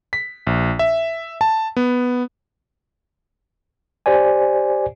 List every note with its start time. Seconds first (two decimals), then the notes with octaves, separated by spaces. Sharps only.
0.13 B6
0.47 A#1
0.79 E5
1.41 A5
1.76 B3
4.06 G4 C5 D5 G#5